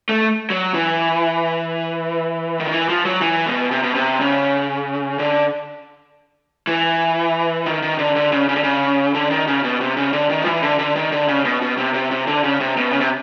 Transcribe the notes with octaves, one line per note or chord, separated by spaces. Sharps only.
A3
F#3
E3
D#3
E3
F3
F#3
E3
B2
C3
B2
C3
C#3
D3
E3
D#3
D#3
D3
D3
C#3
C#3
D3
C#3
D3
D#3
C#3
B2
C3
C#3
D3
D#3
F3
E3
D3
D3
D#3
D3
C#3
B2
B2
C3
C3
C3
D3
C#3
C3
B2
C#3
C3